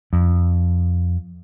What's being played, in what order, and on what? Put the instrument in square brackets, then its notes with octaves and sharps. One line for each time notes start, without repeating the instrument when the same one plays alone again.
[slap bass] F2